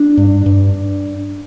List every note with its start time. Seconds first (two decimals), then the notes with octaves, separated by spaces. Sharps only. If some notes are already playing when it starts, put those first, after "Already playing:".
Already playing: D4
0.17 G2
0.46 G2